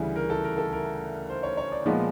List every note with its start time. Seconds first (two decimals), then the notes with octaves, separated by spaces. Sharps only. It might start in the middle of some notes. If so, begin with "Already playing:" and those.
Already playing: D2 C#3 E3 G3
0.16 A#4
0.30 A4
0.44 A#4
0.58 A4
0.72 A#4
1.30 C5
1.43 C#5
1.57 C#5
1.72 D5
1.86 A#2 F3 G#3 B3 D#5